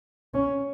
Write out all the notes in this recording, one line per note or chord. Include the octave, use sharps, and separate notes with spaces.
C#4